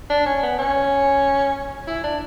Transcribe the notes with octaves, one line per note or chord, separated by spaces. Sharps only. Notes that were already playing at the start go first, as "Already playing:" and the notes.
D4
C#4
B3
C#4
E4
D4